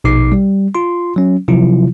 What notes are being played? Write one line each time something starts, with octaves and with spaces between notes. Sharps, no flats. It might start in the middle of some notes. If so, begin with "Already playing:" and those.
A#1 B2 D#4 D6 C7
G3
F4 C6
F#3 C#4
C3 F3 F#3 E4 F4